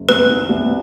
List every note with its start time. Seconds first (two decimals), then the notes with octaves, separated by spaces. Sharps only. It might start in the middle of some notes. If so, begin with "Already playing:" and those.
Already playing: F#1
0.09 C2 B4
0.29 D#3
0.49 C2